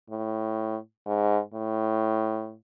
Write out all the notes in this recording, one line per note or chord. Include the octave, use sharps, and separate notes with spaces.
A2
G#2
A2